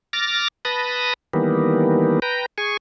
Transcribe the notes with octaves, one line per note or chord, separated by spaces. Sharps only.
D6 F6 A6 A#6
B4 A5 B5 D#6 A#6
D#3 E3 G3 A#3 B3
B4 G5 A#5
G#4 G#5 C#6